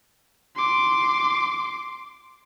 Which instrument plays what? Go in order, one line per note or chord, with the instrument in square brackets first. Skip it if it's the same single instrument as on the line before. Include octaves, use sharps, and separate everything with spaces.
[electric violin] C6 D6